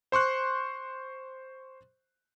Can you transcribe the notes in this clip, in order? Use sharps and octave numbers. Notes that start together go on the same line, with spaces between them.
C5 C6 C#6 F#6